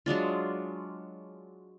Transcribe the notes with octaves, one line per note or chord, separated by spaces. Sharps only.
F#3 G#3 D4 F4